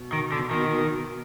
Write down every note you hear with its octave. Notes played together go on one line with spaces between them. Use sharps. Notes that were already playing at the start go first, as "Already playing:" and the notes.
Already playing: B2
D#3
D3
D#3